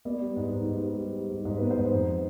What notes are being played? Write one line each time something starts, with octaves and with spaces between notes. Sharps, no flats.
B3 B4 D5
G3
G#2
G#2
G#2
G3
G3
G3
G#2
G#2 C5
B3 B4
C5
G#2
F2